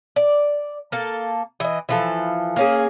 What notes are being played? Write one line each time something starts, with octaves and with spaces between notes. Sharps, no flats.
D5
A#3 A4
E3 D#5
E3 F3 A4
A#3 C#4 G#4